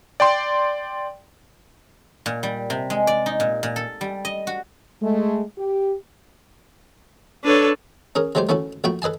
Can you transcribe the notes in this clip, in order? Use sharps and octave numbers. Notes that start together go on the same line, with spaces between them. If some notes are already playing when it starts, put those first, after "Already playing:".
D5 G5 C6
A#2
G3
C3
G#3
D5
D#4
A#2
A#2
A4
G3
D#5
F#4
G#3 A3
G4
D4 A4 B4 C#5
C#4 G#4 A#4
F#3 G#3 A3 G4 C5
A3 C#4 E4 F#4 A4
A#1 A3 F#4 G5 B5 C#6
A4 B4 D#5 G#5 A5